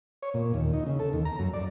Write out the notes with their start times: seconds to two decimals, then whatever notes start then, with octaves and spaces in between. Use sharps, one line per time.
0.22 C#5
0.34 A#2
0.54 D#2
0.73 D#4
0.86 C#3
0.99 A4
1.13 D#2
1.25 A#5
1.39 F#2
1.54 D5